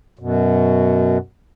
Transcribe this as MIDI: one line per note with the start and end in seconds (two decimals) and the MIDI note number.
0.19 1.18 42
0.19 1.18 47